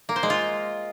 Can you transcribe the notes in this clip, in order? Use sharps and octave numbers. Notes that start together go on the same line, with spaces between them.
A#3
C5
G#3
F4